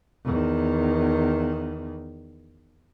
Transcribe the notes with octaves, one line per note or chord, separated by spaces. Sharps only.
E2 D#3